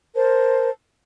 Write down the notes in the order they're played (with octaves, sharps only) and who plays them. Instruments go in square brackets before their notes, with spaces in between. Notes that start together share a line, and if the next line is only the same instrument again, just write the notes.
[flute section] A#4 C5 A5